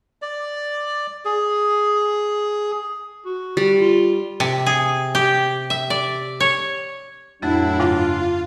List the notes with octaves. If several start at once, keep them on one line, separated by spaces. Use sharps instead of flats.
D5
G#4
F#4
G3
F4
C3
G#4
G4
E5
D5
C#5
F2 A2 F#3 A3 D4 E4
G2 C#3 F4